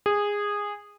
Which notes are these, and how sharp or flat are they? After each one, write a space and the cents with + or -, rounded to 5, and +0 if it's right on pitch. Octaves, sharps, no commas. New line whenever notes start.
G#4 -15